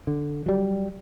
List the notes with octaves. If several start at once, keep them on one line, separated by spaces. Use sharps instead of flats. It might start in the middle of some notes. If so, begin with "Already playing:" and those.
D3
F#3 G3